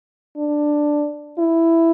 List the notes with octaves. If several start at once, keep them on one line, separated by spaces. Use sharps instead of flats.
D4
E4